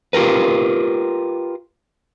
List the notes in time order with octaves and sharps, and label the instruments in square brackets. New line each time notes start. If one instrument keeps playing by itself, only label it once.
[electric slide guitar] F4 G4 A#4 B4